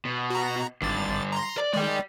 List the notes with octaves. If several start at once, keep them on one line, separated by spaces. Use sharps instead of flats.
B2
F#4 A#5
G#1 G2 D3 A6
A#5 C6
D5
D#3 G#3 D5 G5